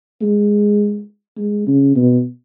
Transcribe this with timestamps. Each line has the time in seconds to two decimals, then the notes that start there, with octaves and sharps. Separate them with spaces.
0.22 G#3
1.37 G#3
1.67 C#3
1.96 B2